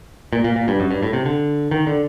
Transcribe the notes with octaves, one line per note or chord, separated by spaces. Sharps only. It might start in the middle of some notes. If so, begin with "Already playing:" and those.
A#2
A#2
A#2
G2
F#2
G2
A2
C3
D3
D#3
D3